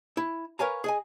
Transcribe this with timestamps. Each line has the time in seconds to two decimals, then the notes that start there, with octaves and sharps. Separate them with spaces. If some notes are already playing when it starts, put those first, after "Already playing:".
0.17 E4
0.59 A#4 B4 C#5 F5 G#5 A#5
0.84 G#4 D#5 G#5